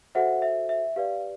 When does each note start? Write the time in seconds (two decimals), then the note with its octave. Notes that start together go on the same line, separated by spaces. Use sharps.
0.15 F#4 A4 C5 E5 F#5
0.42 E5
0.69 E5
0.96 G4 B4 D5 F5